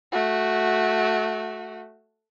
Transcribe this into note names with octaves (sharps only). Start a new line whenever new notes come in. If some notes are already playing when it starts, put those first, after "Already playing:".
A3 F#4